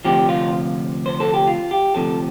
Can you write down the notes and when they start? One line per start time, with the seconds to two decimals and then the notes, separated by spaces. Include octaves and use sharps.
0.05 D2 C3 F3 G4
0.29 F4
1.06 C5
1.20 A4
1.34 G4
1.47 F4
1.71 G4
1.94 D2 C3 F3 A4